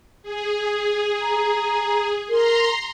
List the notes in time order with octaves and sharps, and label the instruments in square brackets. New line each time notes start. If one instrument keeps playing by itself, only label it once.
[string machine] G#4
[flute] A#5
[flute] A#4 [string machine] A#5 C6